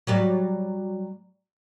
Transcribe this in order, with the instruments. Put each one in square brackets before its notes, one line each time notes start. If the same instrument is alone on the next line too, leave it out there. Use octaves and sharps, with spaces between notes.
[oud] F#3 G3 D5